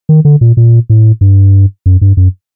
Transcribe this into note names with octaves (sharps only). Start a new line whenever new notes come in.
D#3
D3
A#2
A#2
A2
G2
F#2
G2
F#2